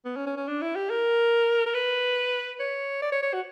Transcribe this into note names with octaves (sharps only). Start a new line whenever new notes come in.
B3
C#4
C#4
C#4
D4
E4
G4
A#4
A#4
B4
C#5
D5
C#5
C#5
F#4